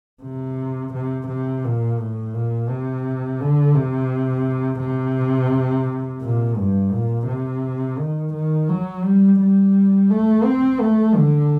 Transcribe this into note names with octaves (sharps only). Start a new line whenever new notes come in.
C3
C3
C3
A#2
A2
A#2
C3
D3
C3
C3
A#2
G2
A#2
C3
D#3
D#3
F#3
G3
G3
A3
C4
A3
D3